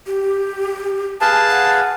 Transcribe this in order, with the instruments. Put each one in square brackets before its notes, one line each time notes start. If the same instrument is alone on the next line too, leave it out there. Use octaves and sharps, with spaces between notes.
[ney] G4
[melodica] G#4 B4 F5 [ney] G#5 [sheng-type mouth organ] A5
[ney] F#5